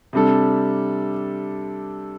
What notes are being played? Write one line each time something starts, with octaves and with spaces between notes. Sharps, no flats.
C3 G3 D4 A4